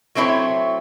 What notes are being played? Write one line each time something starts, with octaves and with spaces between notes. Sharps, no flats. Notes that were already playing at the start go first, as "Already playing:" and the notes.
F#3 A3 C4 E4 C#5